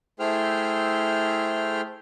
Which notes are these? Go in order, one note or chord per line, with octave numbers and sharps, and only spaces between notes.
A3 E4 G#4 C5 G5 F6